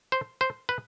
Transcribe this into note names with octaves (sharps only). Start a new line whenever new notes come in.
C5
C5
B4